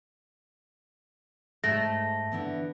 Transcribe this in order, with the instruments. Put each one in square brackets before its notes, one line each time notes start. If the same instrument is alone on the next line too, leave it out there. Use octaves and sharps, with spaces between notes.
[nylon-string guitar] G#2 [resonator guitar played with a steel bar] A3 [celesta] A#6
[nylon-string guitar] D3 E3 B3